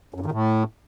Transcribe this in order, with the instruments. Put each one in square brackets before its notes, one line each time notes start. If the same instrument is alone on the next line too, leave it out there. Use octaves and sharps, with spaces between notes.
[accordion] F#2
G2
D#3
A2